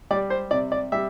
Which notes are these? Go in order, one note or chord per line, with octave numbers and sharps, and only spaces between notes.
G3 D5
C5
C3 D5
D5
G3 E5